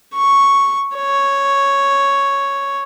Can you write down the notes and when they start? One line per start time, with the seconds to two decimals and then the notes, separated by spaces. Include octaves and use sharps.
0.14 C#6
0.96 C#5